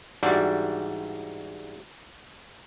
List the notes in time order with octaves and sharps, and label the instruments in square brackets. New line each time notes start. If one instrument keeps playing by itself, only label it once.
[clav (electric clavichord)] G#2 E3 G3 D4 F#4